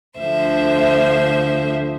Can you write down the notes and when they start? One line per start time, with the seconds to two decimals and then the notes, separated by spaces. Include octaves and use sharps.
0.18 D2 D3 F3 C5 E5